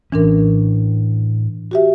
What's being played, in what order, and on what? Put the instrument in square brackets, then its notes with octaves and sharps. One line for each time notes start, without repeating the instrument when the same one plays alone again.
[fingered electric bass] A2 C#4 [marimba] E3 D4 A#4
[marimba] F#4 G4 E5